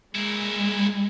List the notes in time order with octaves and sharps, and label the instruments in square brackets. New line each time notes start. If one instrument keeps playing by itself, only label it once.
[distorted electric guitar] A#2 E4 [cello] G#3